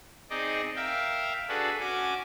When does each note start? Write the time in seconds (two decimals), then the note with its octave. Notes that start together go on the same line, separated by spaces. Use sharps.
0.30 C4 D#4 G#4 D5 D#5
0.76 A#4 E5 F5 G5
1.48 D4 F#4 G#4 A4 B4
1.80 C#4 F#4 G#5 D6